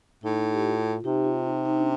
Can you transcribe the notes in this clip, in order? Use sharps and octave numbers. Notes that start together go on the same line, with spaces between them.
A2 D#4
G4
F4
C3 D#4 G4
F4
D#4
D#4
D4